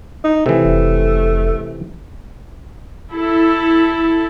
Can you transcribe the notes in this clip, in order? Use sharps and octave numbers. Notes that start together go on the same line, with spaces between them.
D#4
C3 E3 A3
F1
E4 A4